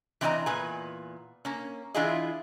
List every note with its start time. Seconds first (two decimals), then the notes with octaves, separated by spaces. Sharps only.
0.21 E3 C4 D4 D5 D#5 A#5
0.46 E2 A#2 B4 G#5
1.45 A#3 C#4
1.94 E3 D4 E4 F4 G#4 D#5